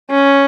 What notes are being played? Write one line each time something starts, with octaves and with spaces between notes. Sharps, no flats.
C#4